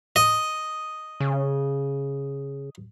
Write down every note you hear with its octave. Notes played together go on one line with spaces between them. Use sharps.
D#5
C#3